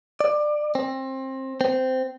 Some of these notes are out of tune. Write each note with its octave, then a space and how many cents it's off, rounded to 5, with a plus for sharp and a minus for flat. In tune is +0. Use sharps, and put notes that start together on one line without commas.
D5 +20
C4 +25
C4 -15